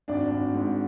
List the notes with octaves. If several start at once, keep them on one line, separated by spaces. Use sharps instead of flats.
G#1 D4 D5
G#1
G#2